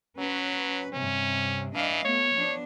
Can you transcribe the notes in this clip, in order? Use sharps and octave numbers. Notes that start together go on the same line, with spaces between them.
F#3 C#4 B4
G2 C3 C#4
E3 D4 D#5 F5
A3 B3 C#5
F3 B3 D4